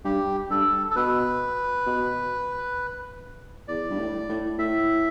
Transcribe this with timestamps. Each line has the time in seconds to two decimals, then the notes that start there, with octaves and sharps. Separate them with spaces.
0.05 G2 G4
0.50 G2 A4
0.90 A4
0.96 B2 B4
1.87 B2
3.68 E2 D5
3.90 G2
3.99 A2
4.29 A2
4.58 A2 E5